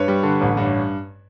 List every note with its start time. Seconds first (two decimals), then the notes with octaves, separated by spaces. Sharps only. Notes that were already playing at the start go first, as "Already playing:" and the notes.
Already playing: G2 B4 C#5
0.08 G3
0.23 D3
0.41 A1
0.57 G2